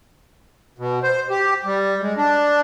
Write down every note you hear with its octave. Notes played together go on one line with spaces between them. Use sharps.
B2
C5
G4
G3
G#3
D4